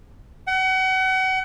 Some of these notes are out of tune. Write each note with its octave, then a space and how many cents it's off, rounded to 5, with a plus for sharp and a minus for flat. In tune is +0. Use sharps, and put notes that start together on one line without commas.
F#5 +35